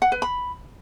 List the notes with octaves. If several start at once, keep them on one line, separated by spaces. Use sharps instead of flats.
F#5
B4
B5